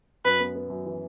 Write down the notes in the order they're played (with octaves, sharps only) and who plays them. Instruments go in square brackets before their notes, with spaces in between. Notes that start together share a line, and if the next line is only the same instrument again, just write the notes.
[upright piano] F#2 [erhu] B4
[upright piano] B3
B3
F#2
E3